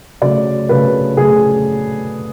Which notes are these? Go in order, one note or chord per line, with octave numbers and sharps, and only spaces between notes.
C#3 F#3 A3 D5
C#3 F#3 A3 B4
C#3 F#3 A3 G#4